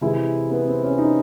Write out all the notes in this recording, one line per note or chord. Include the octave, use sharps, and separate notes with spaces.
C3 E3 G#3 E4
B3
C4
C#4
D#4